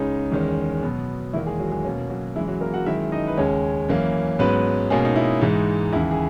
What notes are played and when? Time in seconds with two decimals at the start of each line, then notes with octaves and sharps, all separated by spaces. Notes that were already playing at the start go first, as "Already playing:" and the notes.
Already playing: C#2 C#3 G#3 C#4 D#4
0.32 E2 D#3 G#3 C#4
0.82 B2 F#3 B3
1.33 E2 D#3 A#3 E4
1.46 G#3 G#4
1.59 F#3 F#4
1.71 G#3 G#4
1.85 B2 A#3 C#4
2.10 F#3 F#4
2.36 F#2 E3 G#3 E4
2.48 F#3 F#4
2.61 A#3 A#4
2.74 F#4 F#5
2.86 F#2 D#3 G#3 E4 E5
3.12 D#4 D#5
3.27 B4
3.37 D#2 C#3 G#3 C#4 C#5
3.89 F#2 E3 A#3 C#4
4.39 G#2 F#3 B3 C#4 B4
4.90 B2 G#3 A#3 C#4 G#4
5.05 D#4
5.16 E4
5.41 G#2 E3 G#3 D#4
5.93 D#2 C#3 E3 E4
6.11 G#4